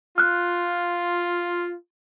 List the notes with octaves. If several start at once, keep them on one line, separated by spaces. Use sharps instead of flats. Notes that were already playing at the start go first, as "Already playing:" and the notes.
F4 F6 F#6